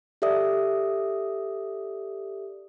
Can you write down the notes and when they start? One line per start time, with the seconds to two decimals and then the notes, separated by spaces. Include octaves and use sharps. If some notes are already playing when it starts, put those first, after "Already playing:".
0.22 G4 A4 D5 E5 D#6